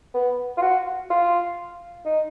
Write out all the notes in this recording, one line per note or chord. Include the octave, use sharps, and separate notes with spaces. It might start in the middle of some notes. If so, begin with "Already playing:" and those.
B3
F4
F#4
F4
D#4